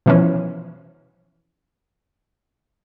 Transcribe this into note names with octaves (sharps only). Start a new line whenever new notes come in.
B2 E3 F3 C#4